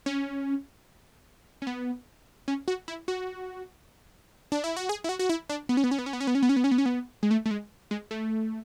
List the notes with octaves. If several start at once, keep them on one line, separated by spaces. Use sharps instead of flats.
C#4
C#4
B3
C#4
F#4
E4
F#4
D4
E4
F#4
G#4
E4
F#4
F#4
E4
D4
B3
C#4
B3
C#4
B3
C#4
B3
C#4
B3
C#4
B3
C#4
B3
C#4
B3
C#4
B3
G#3
A3
A3
G#3
G#3
A3